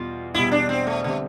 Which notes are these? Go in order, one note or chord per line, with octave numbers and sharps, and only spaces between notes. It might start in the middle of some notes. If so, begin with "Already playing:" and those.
Already playing: E2 B2 G3 F4
E1 E2 B2 G3 E4
D4
C4
A3
D3 G3 A3 C4